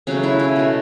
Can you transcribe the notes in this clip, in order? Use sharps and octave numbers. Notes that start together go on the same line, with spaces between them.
C#3 F#3 A3 C#4
E4
C#4
B2 A3